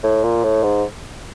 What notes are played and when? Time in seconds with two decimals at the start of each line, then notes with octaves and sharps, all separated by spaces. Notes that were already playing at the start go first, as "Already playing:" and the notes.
0.04 A2
0.24 A#2
0.44 A2
0.63 G#2